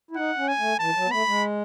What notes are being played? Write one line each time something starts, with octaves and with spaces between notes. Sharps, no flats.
E4
D#4 F#5
C#4
G#5
A3
E3 A5
F#3
B3
A3 B5
G#3